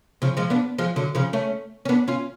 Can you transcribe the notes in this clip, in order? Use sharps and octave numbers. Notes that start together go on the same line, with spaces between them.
C#3 F3
F3 G#3
B3 D4
F3 G#3
D3 F#3
C#3 F3
A3 C#4
C#4
B3 D4
C#4 F4